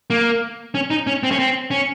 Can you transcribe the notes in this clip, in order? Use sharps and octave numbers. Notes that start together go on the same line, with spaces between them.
A#3
C#4
D#4
C#4
C4
C#4
C4
C#4